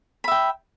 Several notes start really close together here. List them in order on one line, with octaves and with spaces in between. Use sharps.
B5 E5 G5